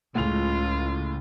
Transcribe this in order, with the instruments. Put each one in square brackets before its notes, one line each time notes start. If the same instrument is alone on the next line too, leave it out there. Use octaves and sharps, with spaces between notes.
[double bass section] C#2 [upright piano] A2 G#4 F7 [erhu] F4